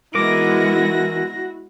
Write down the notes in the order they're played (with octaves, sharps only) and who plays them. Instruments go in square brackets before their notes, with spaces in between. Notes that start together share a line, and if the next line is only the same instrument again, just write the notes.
[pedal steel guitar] E3 A#4 D6 [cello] G#3 B3 [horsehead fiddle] E4 F#4 [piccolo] A#6